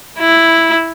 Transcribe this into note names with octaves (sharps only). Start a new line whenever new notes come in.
E4